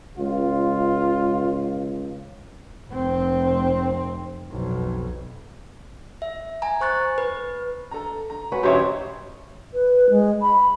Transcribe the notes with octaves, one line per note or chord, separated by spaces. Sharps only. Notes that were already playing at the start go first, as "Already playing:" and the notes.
C#2 F4
F1 C4
B1 F2
E5
G#5 A#5
C5 C#6 F#6 A6
B4
A4 A#5
A#5
C#4 F#4 B4
A1 D2 F#3 G4 C5 C#5 E5
B4
G#3
B5